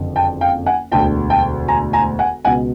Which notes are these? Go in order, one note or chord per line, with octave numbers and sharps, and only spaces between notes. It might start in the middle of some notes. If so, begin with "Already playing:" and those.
Already playing: F#1 F2 D3
G5 A5
F5 G5
F#5 G#5
E1 D2 D3 G5 A5
G5 A5
G#5 A#5
G#5 A#5
F#5 G#5
C#2 B2 F#5 G#5